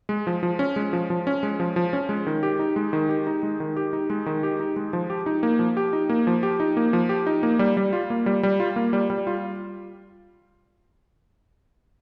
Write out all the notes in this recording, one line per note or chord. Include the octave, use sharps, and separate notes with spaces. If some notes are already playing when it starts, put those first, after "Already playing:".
G#3
F3
F3
C#4
G#3
F3
F3
C#4
G#3
F3
F3
C#4
G#3
D#3
G4
D#4
G#3
D#3
G4
D#4
G#3
D#3
G4
D#4
G#3
D#3
G4
D#4
G#3
F3
G4
D#4
A#3
F3
G4
D#4
A#3
F3
G4
D#4
A#3
F3
G4
D#4
A#3
G3
G3
F4
A#3
G3
G3
F4
A#3
G3
G3
F4